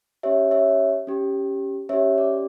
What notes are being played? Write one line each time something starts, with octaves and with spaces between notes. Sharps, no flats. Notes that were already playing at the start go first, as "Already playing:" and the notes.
C#4 G4 C#5 E5
C#5 E5
C#4 G4
C#4 G4 C#5 E5
D5